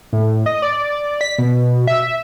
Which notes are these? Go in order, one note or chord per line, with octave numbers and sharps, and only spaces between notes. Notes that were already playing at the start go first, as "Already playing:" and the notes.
A2
D#5
D5
B6
B2
E5